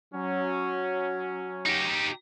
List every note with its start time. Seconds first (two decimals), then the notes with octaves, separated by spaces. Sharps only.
0.14 F#3 C#4
1.66 D#4 G4